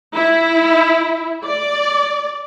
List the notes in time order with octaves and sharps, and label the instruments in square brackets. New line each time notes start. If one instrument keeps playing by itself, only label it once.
[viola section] E4
D5